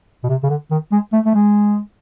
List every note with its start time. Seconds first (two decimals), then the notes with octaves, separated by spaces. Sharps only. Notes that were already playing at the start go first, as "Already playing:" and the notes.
0.24 B2
0.29 C3
0.44 C#3
0.49 D3
0.71 D#3
0.92 G#3
1.13 A3
1.26 A3
1.34 G#3